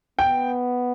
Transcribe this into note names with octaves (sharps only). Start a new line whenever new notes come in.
B3 G5